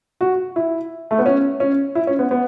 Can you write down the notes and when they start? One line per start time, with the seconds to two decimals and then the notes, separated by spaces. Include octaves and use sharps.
0.21 F#4
0.56 E4
1.11 A3
1.19 B3
1.26 C#4
1.60 C#4
1.95 E4
2.07 C#4
2.19 B3
2.31 B3